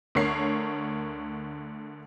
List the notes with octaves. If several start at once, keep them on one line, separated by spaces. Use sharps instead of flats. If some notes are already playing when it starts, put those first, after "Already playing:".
D2 D3 A#4 C#5 C7